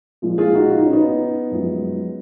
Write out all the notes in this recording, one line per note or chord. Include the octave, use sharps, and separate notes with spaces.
A#2 F3 G#3
F4 G#4
D#4 F#4
F4
D#4
C#4
B3 D#4
F#2 F3 G#3